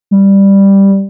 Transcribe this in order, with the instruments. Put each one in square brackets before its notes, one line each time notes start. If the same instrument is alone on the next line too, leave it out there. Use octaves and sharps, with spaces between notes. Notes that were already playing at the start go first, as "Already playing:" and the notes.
[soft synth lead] G3